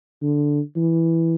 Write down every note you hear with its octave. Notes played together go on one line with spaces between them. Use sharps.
D3
E3